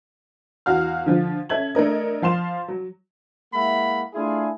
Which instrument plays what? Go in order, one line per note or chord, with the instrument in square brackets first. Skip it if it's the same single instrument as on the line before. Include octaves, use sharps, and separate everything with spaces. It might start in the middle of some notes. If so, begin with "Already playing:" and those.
[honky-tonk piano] E2 F#4 F5 F6
D3 F3 F4
C#4 A4 E5 G#6 F#7
A3 D4 A#4 D#5
F3 F5 C6 E7
F#3
[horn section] G#3 A#3 E4 E5 F#5 B5
A3 D4 E4 F4 G#4